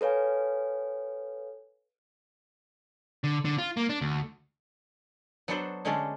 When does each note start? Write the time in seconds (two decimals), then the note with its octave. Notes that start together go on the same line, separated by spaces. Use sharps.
0.01 A4 B4 C#5 F5 G#5
3.24 D3
3.45 D3
3.58 F4
3.77 A#3
3.89 D4
4.01 D2
5.48 F#3 B3 D4 F#4 A4 C5
5.85 D3 G#3 A3 C#4 D4 A4